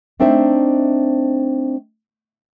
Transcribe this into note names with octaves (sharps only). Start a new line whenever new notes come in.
A3 C4 D4 D#4 C5 E5